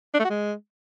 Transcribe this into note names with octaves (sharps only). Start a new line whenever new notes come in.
D4
A3
F#4
G#3